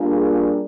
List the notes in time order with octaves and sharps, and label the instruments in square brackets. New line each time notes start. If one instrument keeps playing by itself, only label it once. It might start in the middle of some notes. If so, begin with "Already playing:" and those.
Already playing: [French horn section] G3 A#3 D4 F4 G#4